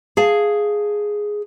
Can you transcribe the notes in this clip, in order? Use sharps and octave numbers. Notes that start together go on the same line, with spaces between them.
G#4 F5 A5